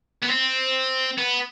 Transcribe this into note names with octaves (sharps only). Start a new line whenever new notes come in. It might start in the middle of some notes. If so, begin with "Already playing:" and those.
B3
C4
B3